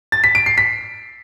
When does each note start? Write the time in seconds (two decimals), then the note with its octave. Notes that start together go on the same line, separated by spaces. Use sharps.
0.12 A6
0.24 B6
0.35 D7
0.46 C7
0.58 B6